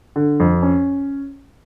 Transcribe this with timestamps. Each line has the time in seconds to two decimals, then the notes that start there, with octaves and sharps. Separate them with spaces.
0.16 D3
0.40 F2
0.63 C#4